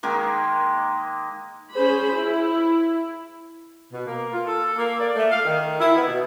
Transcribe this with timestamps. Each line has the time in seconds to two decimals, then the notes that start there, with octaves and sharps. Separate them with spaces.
0.03 D#3 G#3 A#3
1.74 C#4 G#4 C5 B5
2.15 E4
3.92 B2
4.07 A#3
4.33 F4
4.46 A4
4.76 A#3
5.00 D5
5.16 A3
5.31 F5
5.45 D#3
5.80 E4
5.96 B3
6.07 B2